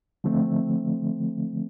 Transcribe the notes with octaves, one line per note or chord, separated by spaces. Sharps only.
D3 F3 A3 C4